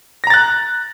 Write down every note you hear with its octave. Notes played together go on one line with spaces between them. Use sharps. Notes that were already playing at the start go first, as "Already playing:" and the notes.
A#5 F#6 A6 A#6